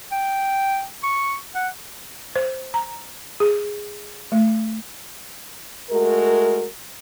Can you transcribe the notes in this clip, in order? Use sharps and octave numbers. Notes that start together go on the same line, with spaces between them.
G5
C#6
F#5
C5
A#5
G#4
A3
G#3 A3 F#4 A#4